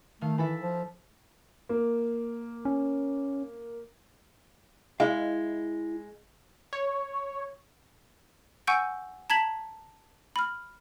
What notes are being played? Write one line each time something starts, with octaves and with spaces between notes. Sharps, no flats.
D#3 A3 F5
E3 E4 A4 E5
F3
A#3
C#4
G#3 E4 F5
C#5
F#5 G#5 C#6 E6 G6 D7
A5 A#5 G#6 B6 F#7
B5 F6